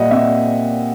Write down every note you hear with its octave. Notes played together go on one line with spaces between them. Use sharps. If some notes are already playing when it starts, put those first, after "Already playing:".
Already playing: A#2 G3 D#5 E5 F#5
C4 E5